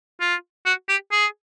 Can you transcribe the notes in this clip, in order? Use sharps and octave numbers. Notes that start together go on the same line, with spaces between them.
F4
F#4
G4
G#4